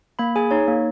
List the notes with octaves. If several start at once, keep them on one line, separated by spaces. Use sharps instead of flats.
A#3 B5
G#4 G#5
D#4 C#5
A#3